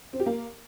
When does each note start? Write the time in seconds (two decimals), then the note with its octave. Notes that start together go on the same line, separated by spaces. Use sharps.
0.13 C4
0.20 G4
0.26 A#3